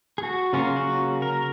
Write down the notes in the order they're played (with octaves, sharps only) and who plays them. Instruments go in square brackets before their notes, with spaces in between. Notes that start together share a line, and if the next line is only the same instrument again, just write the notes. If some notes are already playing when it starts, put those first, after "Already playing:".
[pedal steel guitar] G#4
F#4
C#3 F#3 A#3 C#4 F4
F#4
A#4